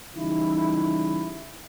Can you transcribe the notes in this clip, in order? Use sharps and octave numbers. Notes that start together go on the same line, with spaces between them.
C#3 E3 G3 D#4 E4